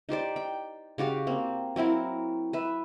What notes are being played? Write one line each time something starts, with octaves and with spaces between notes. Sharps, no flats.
D#4 G4 C5 D5
G5
C#3 F#4 G4 F5
A#3 C4
F#3 C4 E4 A#4
B4 E5